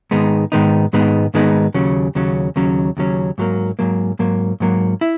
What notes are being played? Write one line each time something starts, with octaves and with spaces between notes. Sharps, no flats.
G#2 D#3 G#3 B3 D#4
G#2 D#3 G#3 B3 D#4
G#2 D#3 G#3 B3 D#4
G#2 D#3 G#3 B3 D#4
D#2 C#3 F#3 C#4
D#2 C#3 F#3 C#4
D#2 C#3 F#3 C#4
D#2 C#3 F#3 C#4
G#2 F#3 A#3
G#2 F#3 A#3
G#2 F#3 A#3
G#2 F#3 A#3
E4